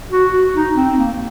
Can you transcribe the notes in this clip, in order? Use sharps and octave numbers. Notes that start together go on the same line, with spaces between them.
F#4
F#4
D#4
C4
A#3